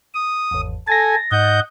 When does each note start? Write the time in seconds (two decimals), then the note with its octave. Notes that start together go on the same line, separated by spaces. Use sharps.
0.14 D#6
0.51 G#1 E2
0.88 A4 G#5 A6 A#6
1.31 G#2 D#5 F#5 G6